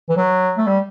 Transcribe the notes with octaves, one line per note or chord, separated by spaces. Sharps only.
E3
F#3
A3
G3